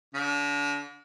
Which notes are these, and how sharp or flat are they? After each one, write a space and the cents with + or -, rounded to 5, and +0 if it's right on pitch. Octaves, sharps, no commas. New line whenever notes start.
D3 -35